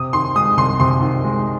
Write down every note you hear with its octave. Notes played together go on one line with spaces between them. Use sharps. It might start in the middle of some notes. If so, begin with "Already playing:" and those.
Already playing: C3 D#6
D#3 C6
G#3 D#6
C2 C6
C3 C6
D#3
G#3